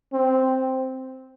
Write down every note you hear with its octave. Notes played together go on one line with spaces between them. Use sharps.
C4